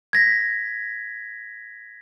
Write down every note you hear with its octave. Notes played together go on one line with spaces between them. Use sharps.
G#6 A#6 B6